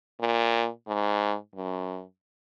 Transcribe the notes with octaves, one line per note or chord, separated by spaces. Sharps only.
A#2
G#2
F#2